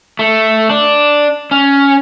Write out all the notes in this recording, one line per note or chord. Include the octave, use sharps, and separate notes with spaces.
A3
D4
C#4